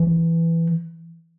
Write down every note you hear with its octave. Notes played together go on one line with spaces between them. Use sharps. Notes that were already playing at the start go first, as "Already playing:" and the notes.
Already playing: E3